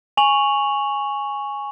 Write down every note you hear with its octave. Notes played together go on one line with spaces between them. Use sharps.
G#5 C#6 F7 F#7